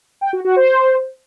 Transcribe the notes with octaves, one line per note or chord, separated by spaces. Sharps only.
G5
F#4
F#4
C5